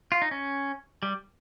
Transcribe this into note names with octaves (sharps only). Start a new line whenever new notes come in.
F4
D#4
C#4
G3